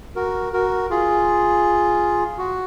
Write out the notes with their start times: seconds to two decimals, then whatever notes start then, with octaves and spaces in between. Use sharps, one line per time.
0.16 F#4 A#4
0.53 F#4 A#4
0.90 F4 G#4
2.38 F#4